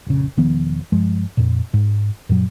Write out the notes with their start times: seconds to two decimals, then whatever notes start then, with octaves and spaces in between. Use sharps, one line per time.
0.07 F1 A#1 C#3
0.37 E1 D#3 F3 B3
0.92 G2 F3 G#3
1.37 F2 A#2
1.74 G#2
2.29 F#2 A#2 F#3